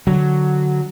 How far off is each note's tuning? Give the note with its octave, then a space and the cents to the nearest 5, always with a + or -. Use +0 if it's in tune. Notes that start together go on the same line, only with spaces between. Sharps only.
D3 +0 F#3 +0